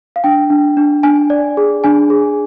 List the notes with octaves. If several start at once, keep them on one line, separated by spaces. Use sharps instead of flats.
F5
D4 G5
D4
D4
D4 G#5
D5
G#4
D4 G#5
G#4